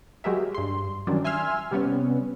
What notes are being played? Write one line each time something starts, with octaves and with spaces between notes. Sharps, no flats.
F#3 G#3 G4 G#4 A#4 E5
G2 C6
D#3 E3 F#3 G3 C#4 D4
E5 G#5 C6 E6 F6 G#6
C3 G3 B3 C#4